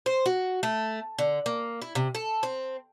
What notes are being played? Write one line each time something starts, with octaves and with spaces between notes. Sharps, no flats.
C5
F#4
A3
D3
A#3
E4
C3
A4
C4